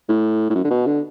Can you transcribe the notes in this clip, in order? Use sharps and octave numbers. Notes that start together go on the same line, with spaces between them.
A2
A2
F#2
D3
B2
D3